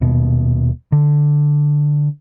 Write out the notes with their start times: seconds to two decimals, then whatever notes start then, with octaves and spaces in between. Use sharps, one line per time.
0.01 D#1 B2
0.92 D3